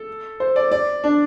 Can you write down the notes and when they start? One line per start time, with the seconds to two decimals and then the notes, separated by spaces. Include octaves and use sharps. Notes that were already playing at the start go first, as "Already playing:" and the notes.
Already playing: A4
0.40 C5
0.56 D5
0.72 D5
1.04 D4